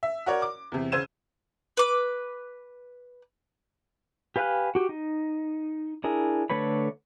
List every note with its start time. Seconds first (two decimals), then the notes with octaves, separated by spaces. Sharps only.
0.03 E5
0.26 F#4 A#4 C#5 D5
0.42 D6
0.72 E2 C3
0.92 C#3 C5 E6 G#6 D#7 E7
1.77 B4 D6
4.36 G4 B4 F5 G#5 F#6
4.75 F#4 G4
4.89 D#4
6.04 D4 E4 G#4 A#4
6.50 D3 A3 B4 C#5 B5